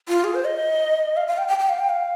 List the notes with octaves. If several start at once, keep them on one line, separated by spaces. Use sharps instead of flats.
F4
G#4
C5
D#5
F5
F5
G5
G5
G5
F5
G5
F5